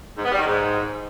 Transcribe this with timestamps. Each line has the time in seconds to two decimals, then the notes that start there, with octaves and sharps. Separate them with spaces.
0.18 G#2
0.25 B3
0.32 G3
0.39 D#3
0.46 G#2